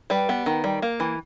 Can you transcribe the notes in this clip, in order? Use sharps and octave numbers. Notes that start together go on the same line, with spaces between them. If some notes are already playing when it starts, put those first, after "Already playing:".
G3 B4
B3
D#3
G3
A#3
E3